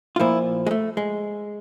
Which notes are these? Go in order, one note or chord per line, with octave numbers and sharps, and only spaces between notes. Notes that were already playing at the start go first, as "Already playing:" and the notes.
F4
A#2 F3 E4
G#3
A3
G#3